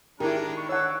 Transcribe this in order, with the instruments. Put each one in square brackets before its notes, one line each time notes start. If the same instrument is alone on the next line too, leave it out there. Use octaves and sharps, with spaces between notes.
[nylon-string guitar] D#3 [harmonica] G#3 D4 A#5 [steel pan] E4 G4
[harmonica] C#6
[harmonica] D4 E6 [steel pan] C#5 F#5